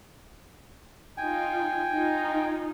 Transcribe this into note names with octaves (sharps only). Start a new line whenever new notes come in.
D#4 F4 G5 G#5
D#4 F4